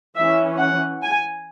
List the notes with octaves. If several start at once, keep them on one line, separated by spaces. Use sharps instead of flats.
E3 C#4 E5
F#5
G#5